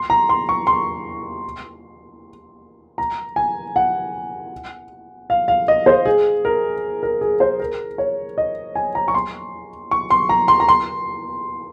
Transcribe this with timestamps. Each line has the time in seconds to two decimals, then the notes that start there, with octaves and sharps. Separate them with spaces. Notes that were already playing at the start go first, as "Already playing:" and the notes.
Already playing: C6
0.10 A#5
0.29 C6
0.49 C#6
0.67 C6
2.98 A#5
3.36 G#5
3.76 F#5
5.30 F5
5.48 F5
5.68 D#5
5.86 C5
6.06 G#4
6.45 A#4
7.03 A#4
7.21 G#4
7.40 C5
7.59 A#4
7.98 C#5
8.38 D#5
8.75 G#5
8.95 A#5
9.08 C#6
9.15 C6
9.91 C#6
10.10 C6
10.29 A#5
10.48 C6
10.60 A#5
10.68 C6